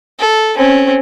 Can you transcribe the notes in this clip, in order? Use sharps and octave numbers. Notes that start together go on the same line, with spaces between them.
A4
C4 C#4